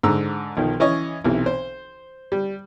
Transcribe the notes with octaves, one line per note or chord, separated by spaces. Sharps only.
G#2 D3 A#5 E6
B1 D#3 F3
E3 C#4 C#5 D#5
B1 C3 E3
C5
G3